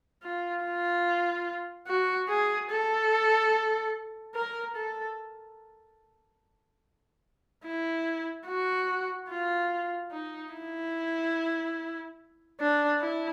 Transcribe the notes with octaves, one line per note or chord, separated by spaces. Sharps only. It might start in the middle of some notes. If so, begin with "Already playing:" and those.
F4
F4
F#4
G#4
A4
A#4
A4
E4
F#4
F4
D#4
E4
D4
E4